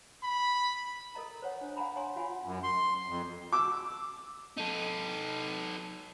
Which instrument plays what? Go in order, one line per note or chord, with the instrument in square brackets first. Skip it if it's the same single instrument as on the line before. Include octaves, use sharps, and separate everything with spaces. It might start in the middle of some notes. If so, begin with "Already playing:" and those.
[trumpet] B5
[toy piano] A4 A#4 D#5 A#5
C5 C#5 F#5
D4
F5 F#5 G#5 A#5 B5
C#5 F5 G#5 C6
F4 F#4 F5 F#5 G#5 B5
[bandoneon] F#2
C6
F2
[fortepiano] D6 E6
[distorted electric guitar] D#4 A4